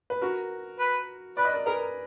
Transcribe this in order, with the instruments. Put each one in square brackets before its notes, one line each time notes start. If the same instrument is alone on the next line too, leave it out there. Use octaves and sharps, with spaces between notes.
[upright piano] B4
F#4 A#4
[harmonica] B4
[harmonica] B4 [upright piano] D5
[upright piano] D#5
A#4 D5
[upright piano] G#4 B4 [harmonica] A#4